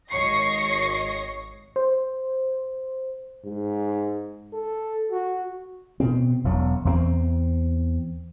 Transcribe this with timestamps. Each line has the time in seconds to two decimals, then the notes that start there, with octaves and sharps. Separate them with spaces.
0.11 G#1 C#5 D#5 C#6 A#6 C7
1.76 C5
3.45 G#2
4.53 A4
5.11 F#4
6.00 B2 C4
6.44 E1 E2 F#3
6.85 E2 A3 C4